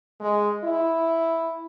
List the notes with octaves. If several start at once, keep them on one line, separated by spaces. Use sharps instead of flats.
G#3
E4